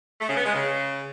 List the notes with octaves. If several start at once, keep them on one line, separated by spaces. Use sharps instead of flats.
A3
C#3
B3
G#3
C#3